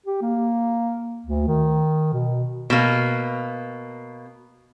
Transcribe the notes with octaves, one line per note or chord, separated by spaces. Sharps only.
G4
A#3
D2
D#3
B2
B2 A#3